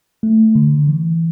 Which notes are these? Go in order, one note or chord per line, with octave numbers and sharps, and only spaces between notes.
A3
D3
E3